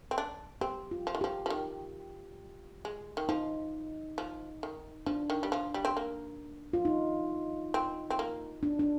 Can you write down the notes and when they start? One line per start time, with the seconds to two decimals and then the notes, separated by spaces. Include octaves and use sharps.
0.11 C4
0.18 D4
0.61 C4 G4
0.91 F4
1.07 F3
1.15 D#3
1.21 F3 G4
1.46 F3
1.50 D#3
2.85 G#3
3.17 D#3
3.29 F3 D#4
4.18 F3
4.63 D#3
5.06 F3 D4
5.30 D#3
5.43 G3
5.52 F3
5.74 G3
5.85 C4
5.97 A#3
6.73 F4
6.85 D#4
7.74 C4
8.10 C4
8.19 A#3
8.63 D4
8.79 D4